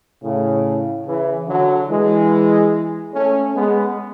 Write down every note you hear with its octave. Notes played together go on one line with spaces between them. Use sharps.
A2 C#3
C#3 E3
D3 F#3
E3 G#3
A3 C#4
G#3 B3